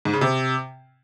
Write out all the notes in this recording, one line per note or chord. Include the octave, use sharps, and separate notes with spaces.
G#2
C#3
C3